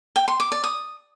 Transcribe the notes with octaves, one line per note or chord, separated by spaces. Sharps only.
G5
C6
D6
D5
D#6